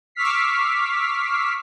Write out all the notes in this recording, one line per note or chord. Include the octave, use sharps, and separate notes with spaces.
C#6 D6 E6 F6 B6 C7